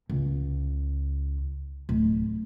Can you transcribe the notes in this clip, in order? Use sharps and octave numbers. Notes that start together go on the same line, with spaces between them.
C#2
D1